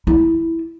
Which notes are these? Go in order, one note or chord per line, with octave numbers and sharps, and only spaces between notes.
E4